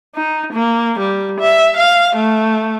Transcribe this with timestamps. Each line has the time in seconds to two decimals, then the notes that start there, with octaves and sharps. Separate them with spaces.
0.15 D#4
0.53 A#3
0.99 G3
1.40 E5
1.76 F5
2.15 A3